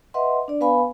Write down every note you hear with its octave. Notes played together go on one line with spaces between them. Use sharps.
B4 D#5 E5 F#5 C6
D4 D5
B3 B4 F5 G#5 B5